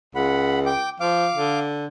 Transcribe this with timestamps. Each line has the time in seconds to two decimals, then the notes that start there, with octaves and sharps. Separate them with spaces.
0.15 C#2 F#5 B5
0.66 G5 D6
1.00 F3 F5 D6
1.35 D3